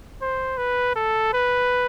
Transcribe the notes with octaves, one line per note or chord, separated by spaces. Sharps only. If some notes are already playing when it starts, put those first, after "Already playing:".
C5
B4
A4
B4